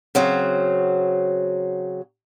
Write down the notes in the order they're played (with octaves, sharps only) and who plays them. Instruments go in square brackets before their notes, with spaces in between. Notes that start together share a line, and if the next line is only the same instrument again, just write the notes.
[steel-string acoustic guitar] C#3 F#3 C4